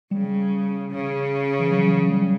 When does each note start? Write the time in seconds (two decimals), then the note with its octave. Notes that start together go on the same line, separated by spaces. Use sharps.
0.11 C#3 G3
0.91 C#3
1.60 E3
1.71 F#3
1.90 F#3
2.10 G3